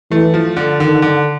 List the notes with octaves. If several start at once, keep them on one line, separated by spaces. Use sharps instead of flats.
E3 A3
F3
D3
D3 D#3
D3